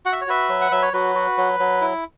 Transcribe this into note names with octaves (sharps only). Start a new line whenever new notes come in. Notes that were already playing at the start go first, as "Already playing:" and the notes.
F#4 F#5
E5
C#5
F#4 B4 E5
F#3
F#5
F#3 E5
C#5
F#3 F#4 B4
F#4
F#3
F#3
E4